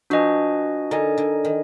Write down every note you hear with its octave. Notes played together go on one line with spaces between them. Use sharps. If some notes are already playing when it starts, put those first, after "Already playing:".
F3 D4 F#4 B4 D#5 G#5
D3 D#4 A#4 D#5 G#5
D3
D#3